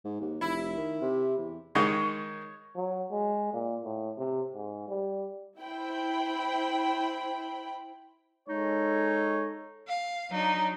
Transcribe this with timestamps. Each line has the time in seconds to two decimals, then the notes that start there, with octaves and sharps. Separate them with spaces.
0.05 G#2
0.21 D#2
0.41 F1 E4
0.77 D#3
1.01 C3
1.38 E2
1.75 D#3 G#3 D#4 C#5
2.75 F#3
3.11 G#3
3.53 A#2
3.84 A2
4.18 C3
4.54 G#2
4.88 G3
5.60 E4 C5 G5 B5
8.49 G#3 D#4 A4 C#5
9.89 F5
10.31 F#3 D4 D#4